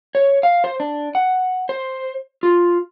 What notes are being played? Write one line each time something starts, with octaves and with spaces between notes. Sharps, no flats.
C#5
F5
C5
D4
F#5
C5
F4